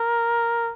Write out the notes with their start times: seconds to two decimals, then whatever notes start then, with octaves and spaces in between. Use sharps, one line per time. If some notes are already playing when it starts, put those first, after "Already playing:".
Already playing: A#4